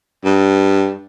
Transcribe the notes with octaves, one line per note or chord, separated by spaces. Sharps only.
G2